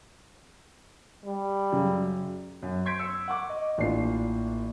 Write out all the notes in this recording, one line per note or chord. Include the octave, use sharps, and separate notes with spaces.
G3
F#2 C#3
F#2
C6 G6 G#6 B6 D7
E6 C#7
F#5 C#6 D6
D#5
A1 A#2 D4 F4 C7